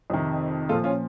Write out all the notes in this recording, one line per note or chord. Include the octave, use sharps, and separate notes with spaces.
F2 C3 D#3
A#2 F3 F4 A4
C#4 F4